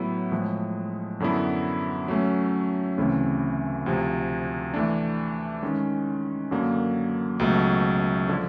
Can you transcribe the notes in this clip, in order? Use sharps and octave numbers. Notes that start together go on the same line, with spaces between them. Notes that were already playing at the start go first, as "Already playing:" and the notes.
Already playing: A2 F#3 B3 E4
A2 F3 G#3
F#2 D3 F#3 B3 E4
F#3 A3 C#4
D2 C#3 E3 A3 C4
D2 C3 F3
E3 A3 D4
D#3 G#3 C#4
F#2 D3 F#3 A#3
C#2 B2 F#3 A3
D3 F3